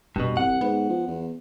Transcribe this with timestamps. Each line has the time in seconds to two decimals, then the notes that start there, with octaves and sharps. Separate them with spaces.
0.16 F1 G2 B2
0.37 C2 F#5
0.61 G#2 B3
0.89 F3
1.07 E2